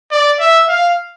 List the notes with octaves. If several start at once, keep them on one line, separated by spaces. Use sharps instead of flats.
D5
E5
F5